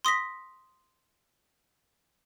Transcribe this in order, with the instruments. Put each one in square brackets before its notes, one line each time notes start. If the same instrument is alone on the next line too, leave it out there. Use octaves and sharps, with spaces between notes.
[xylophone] C6 D#6 A#6 B6